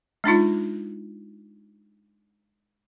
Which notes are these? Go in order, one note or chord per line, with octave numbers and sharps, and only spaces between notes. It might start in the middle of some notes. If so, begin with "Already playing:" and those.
G#3 D4 D#4 F4